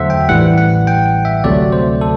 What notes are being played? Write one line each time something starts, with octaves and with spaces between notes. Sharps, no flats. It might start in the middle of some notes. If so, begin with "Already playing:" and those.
Already playing: E2 D3 F#3 A3 A4 C5 E5 F#5
G5
A1 A2 E3 G3 F#5
F#5
G5
E5
D2 C3 F#3 A3 D5
C5
A4